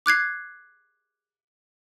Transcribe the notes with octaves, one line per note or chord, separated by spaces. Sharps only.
D6 F#6 G#6 C7